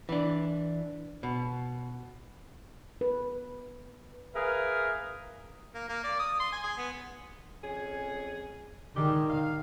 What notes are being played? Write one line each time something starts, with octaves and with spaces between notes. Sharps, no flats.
E3 D4
B2
B4
G#4 A#4 B4 E5 F5
A#3
A#3
D5
D#6
C6
G#5
G#4
B3
F2 C#4 G#4
D#3 G3 G#3 G4
F5